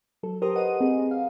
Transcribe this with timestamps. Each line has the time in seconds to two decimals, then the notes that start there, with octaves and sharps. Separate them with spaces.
0.23 F#3 A4
0.42 G4 A#4 C5 A#5 C6 D#6
0.55 B4 D#5 F#5 D#7
0.80 C4 G#4
1.11 F5